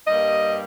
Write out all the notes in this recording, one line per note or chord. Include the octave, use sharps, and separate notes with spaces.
G2 G3 A#3 D#5